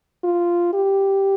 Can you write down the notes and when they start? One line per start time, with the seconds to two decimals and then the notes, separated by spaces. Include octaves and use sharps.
0.24 F4
0.73 G4